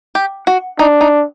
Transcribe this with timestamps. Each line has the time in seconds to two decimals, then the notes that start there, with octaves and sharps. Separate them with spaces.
0.15 G4
0.47 F#4
0.79 D4 D#4
1.01 D#4